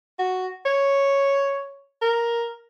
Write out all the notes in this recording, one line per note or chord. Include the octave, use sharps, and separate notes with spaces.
F#4
C#5
A#4